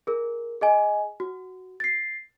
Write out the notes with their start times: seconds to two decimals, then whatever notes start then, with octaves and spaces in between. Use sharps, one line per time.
0.07 G#4 A#4
0.61 G#4 D#5 G#5
1.20 F#4
1.80 A6 C7